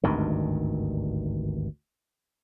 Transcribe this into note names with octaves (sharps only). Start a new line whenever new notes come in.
G#1 D2 G2 D#3